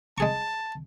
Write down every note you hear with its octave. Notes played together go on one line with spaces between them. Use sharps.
G#3 G#4 A5 C#6